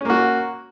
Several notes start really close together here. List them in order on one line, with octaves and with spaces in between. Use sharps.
C#4 A#3 F#4